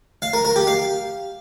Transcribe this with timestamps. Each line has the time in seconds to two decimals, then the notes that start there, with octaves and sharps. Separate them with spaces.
0.22 F5
0.33 A#4
0.45 A#4
0.56 G4
0.67 F5